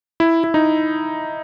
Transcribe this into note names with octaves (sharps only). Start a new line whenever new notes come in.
E4
E4
D#4